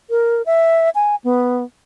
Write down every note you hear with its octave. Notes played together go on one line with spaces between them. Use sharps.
A#4
E5
G#5
B3